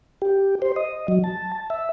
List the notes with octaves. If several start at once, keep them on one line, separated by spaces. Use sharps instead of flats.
G4
C5
D#5
F#3
A5
E5